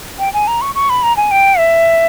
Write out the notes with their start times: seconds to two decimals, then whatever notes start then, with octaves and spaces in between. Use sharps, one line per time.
0.19 G5
0.33 G#5
0.48 A#5
0.62 C#6
0.75 C#6
0.90 B5
1.03 A#5
1.17 G#5
1.31 G5
1.58 E5